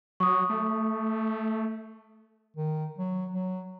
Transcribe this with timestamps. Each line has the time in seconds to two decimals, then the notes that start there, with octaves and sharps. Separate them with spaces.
0.20 F#3 C#6 D#6
0.50 A3
2.57 D#3
2.99 F#3
3.34 F#3